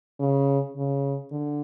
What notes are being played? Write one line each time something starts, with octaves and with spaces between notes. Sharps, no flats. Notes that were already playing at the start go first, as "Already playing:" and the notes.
C#3
C#3
D3